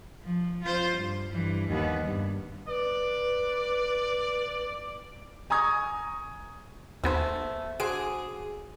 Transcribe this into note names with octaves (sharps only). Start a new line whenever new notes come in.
F3
F4 C5
G2
G2 E3
D#2 B3
G2
B4 D5
G#5 A#5 C#6 D#6 G#6
D#2 A3 B3 G#4 C5
D3 F#4 G#4 C5 D7